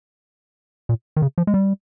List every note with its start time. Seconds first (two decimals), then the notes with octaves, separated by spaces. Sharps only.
0.89 A#2
1.17 D#3
1.22 C#3
1.38 F3
1.47 G#3
1.54 G3